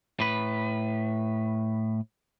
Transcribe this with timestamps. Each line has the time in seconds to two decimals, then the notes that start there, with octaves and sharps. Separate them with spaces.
0.20 A2 B4